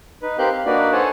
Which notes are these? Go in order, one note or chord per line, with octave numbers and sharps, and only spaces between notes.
D#4 B4
C4 G4 A#4 F5 F#6 G6
F5
A#3 D4 D#4 F#4 B4 D5
A4 C5 C#5 F#5 G#5 A5